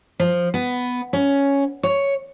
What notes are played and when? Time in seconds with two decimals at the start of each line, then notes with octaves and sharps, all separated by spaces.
0.20 F3
0.54 B3
1.13 C#4
1.83 C#5